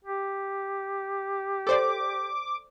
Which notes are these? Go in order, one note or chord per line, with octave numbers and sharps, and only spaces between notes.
G4
A4 C5 D5 D6